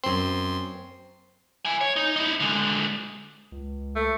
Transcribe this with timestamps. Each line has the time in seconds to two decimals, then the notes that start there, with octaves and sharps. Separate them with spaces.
0.04 F#2 C4 C6
1.65 E5 G#5
1.81 C#5
1.96 D#4
2.16 D#4 E4
2.40 D3 G#3
3.52 C#2
3.96 A3